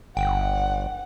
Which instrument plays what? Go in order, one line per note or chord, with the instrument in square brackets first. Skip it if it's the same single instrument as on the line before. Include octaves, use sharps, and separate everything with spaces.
[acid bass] G1 [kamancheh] F#5 [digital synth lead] G5